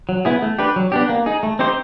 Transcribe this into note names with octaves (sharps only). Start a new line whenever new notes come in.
F#3
B3 E4 G#4
A3
D4 G4 B4
F#3
B3 D4 G4
A#3
D#4 G#4
A3
C4 D#4 G4 C5